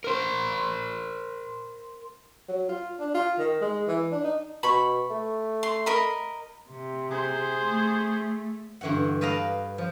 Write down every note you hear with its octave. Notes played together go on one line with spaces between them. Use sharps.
A#4 C5
F#3
F4
D4
F4
D#3
G#3
E3
D4
D#4
B2 B5 C#6
A3
C6
A#4 D#5 B5
C3
G#4 C5
A3
G2 D3 E3 F#4 F#5
B4 D5 D#5 F5 A5 A#5
F3